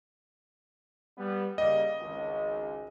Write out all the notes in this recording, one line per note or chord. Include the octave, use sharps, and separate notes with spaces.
G3 B3
C#3 G3 A#3 D#5
G#1 C#2